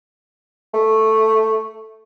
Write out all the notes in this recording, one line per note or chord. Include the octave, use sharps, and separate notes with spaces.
A3